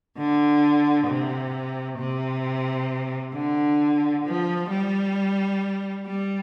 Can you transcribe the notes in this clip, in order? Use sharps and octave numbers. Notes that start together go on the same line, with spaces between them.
D3
C3
C3
D3
F3
G3
G3